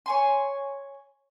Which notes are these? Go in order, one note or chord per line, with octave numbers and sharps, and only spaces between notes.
C#5 G#5 C6